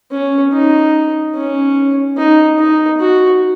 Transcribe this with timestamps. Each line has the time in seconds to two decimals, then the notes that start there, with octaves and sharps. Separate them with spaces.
0.12 C#4
0.53 D#4
1.35 C#4
2.17 D#4
2.59 D#4
3.00 F#4